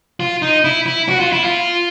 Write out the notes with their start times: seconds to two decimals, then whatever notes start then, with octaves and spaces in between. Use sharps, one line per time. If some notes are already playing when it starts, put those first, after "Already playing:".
0.20 F4
0.42 D#4
0.64 E4
0.86 E4
1.09 F#4
1.20 F4
1.32 E4
1.44 F4